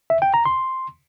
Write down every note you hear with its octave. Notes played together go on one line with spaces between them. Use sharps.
E5
G5
A#5
C6